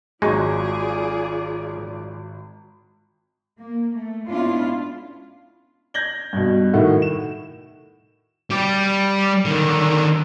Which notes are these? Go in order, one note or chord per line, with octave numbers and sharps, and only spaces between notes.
G#1 F#3 G#3 D#4 F4 G#4 D5 C#6
A#3
A3
G#3 B3 C#4 D4 E4 F4
G6 G#6 A#6 F#7 G7
G2 B2
A2 D#3 A3 F#4
E7
G3 G4
D3 D#3